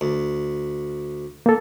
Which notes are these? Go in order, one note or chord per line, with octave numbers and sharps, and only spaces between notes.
D2
A#3 A4